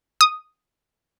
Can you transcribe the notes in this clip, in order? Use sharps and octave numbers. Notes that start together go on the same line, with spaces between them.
D#6